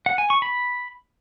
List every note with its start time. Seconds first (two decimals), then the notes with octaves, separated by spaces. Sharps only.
0.06 F#5
0.18 G#5
0.30 C#6
0.42 B5